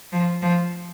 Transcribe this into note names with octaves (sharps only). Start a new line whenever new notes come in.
F3
F3